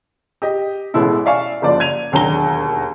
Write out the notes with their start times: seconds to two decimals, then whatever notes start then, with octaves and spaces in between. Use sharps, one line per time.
0.42 G4 D#5
0.94 A1 B2 G#3 E4 A4
1.25 D5 E5 F5 G#5 C#6
1.62 F#1 F3 D5
1.80 G#6 D#7 F7
2.12 E1 D#2 D3 F#3 A#5 G7